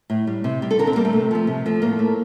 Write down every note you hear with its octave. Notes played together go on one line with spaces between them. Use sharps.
A2
G3
C3
G3
A4
D3 A#4
C4
G3 A#3
A3
C3
F3 A3
C3
F3 A3
A2 A#3
A3